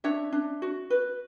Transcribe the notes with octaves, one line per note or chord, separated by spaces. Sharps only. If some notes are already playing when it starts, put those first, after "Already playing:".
D4 C#5 E5
D4
F#4
B4